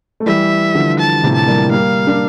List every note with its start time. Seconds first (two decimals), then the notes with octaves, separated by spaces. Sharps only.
0.20 A3
0.26 E3 G3 E5
0.75 D3 F3
0.99 A5
1.23 A2 C3
1.35 A5
1.47 G3 A#3
1.71 G3 A#3 F5
2.07 A#3 D4